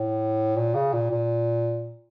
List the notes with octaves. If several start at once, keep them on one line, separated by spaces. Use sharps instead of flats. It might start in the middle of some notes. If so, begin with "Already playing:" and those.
Already playing: A2
A#2
C#3
A#2
A#2